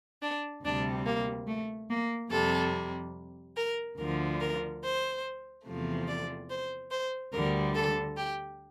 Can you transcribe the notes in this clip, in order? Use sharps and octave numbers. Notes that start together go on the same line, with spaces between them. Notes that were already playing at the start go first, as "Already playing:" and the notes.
D4
D2 C3 G3 D4
A#3
A3
A#3
F2 C3 G3 A4
A#4
D2 D3 F3 A#4
A#4
C5
E2 C3 F3 A3
D5
C5
C5
D2 D3 G3 A#4
A4
G4